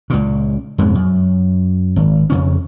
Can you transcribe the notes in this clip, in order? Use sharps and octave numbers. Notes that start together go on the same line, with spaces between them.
C#2 A#2
F2 G#2 B2 G#3
F#2
G#1
F2 C#3 C#4